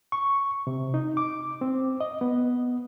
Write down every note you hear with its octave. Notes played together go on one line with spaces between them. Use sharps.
C#6
C3
D#4
D6
C4
D#5
B3